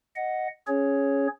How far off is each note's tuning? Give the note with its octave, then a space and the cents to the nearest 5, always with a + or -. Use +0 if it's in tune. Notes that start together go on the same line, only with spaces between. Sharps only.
D#5 +0 F#5 +0
C#4 +0 G#4 +10 C#5 +0